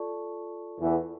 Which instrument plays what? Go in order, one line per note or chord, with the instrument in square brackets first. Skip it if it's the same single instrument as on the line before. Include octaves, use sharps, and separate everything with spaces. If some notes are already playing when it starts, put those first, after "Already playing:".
Already playing: [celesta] F4 A4 D5 A5 C#6
[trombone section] E2 E3